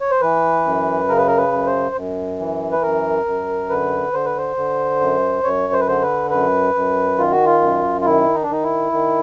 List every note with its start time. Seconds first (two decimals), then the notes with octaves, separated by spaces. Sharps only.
0.01 C#5
0.11 C5
0.21 E3 B4
0.65 F#2
1.08 C#3 A#4
1.18 B4
1.27 A#4
1.37 B4
1.52 F#2
1.66 C5
1.95 F#2
2.39 E3
2.72 B4
2.82 F#2 A#4
3.26 F#2
3.69 D3 B4
4.13 D3 C5
4.25 B4
4.38 C5
4.57 D3
5.00 F#2
5.44 F#2 C#5
5.73 C5
5.80 B4
5.87 D3 C5
6.02 B4
6.31 F#2 B4
6.75 F#2
7.18 D#3 F4
7.32 F#4
7.45 F4
7.61 F#2
8.01 F4
8.05 D#3 E4
8.34 D#4
8.43 D4
8.49 D#3 D#4
8.63 E4
8.92 D#3